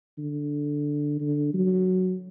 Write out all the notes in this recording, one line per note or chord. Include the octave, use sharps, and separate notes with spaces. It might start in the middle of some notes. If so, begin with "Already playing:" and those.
D3
D3
F#3